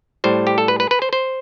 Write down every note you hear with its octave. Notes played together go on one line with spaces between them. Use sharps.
A2 G3 C5
G4
A4
B4
B4
B4
C5
C5